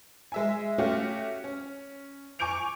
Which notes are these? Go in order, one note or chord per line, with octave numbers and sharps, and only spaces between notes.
G#3 E5 G#5
A3 C#4 F#4 G4 F5
C#4
G#5 C#6 D6 G6 D7 F7